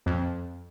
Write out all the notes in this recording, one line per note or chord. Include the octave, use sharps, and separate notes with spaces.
F2